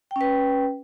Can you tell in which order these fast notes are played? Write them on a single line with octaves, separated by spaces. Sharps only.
G5 C#4 B4